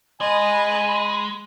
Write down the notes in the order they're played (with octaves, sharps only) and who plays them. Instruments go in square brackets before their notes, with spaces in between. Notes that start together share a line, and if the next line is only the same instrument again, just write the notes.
[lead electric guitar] G#3 [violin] D#5 [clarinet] G#5 [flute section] B5